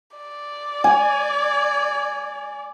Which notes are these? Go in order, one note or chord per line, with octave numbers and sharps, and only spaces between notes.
D5
G#5